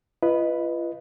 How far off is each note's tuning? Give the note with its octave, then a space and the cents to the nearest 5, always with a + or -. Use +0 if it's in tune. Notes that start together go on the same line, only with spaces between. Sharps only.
F4 -35 B4 +0 D#5 +0